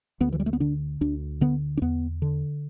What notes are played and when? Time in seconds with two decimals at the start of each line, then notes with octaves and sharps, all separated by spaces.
0.20 D2 B3
0.32 E3
0.40 G3
0.46 A3
0.53 B3
0.60 D3 D4
1.01 D2 D4
1.41 D3 B3
1.77 D4
1.82 E2 B3
2.22 D3